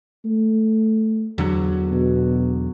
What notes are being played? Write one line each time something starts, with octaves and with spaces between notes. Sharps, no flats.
A3
E2 D3 F#3
B2